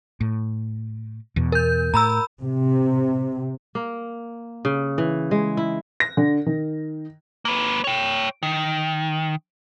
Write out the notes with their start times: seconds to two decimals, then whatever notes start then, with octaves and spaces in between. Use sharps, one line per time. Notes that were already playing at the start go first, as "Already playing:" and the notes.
0.21 A2
1.36 E2 B2
1.52 A#4 G6
1.94 A2 A#5 B5 E6
2.42 C3
3.75 A#3
4.65 C#3
4.98 E3
5.31 G#3
5.57 E4
6.00 A#6
6.17 D3
6.46 D#3
7.45 A#3 B4
7.84 C#5 G5
8.43 D#3